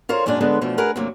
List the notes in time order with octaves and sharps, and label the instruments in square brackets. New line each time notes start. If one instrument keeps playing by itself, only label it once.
[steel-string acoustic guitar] F4 A#4 C5 C#5
F#2 A#2 G#3 C#4 D4
D3 G#3 B3 A4 B4 C#5
B2 E3 F3 A3
G#4 A#4 B4 F#5
D2 G2 C3 F#3 A#3